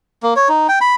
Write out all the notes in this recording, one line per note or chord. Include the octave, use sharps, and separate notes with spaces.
A#3
C#5
D#4
G5
B5